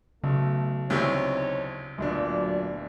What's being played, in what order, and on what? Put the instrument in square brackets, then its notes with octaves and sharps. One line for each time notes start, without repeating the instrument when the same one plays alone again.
[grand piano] B1 [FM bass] C#3 [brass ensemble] A3
[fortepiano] D2 C3 E3 [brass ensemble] C4 D#4 C#5
[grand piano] D1 B1 D4 [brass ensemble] A#2 D5